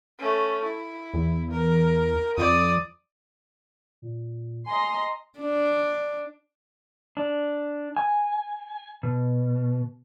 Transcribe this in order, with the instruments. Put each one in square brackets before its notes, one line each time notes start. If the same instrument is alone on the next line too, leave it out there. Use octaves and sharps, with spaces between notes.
[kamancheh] A3 C#4
E4
[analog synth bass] E2
[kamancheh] A#4
[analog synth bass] F2 [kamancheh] D5 D#6
[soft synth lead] A#2
[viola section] D#5 A#5 C6 [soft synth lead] G#5
[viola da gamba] D4
[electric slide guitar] D4
G#5
B2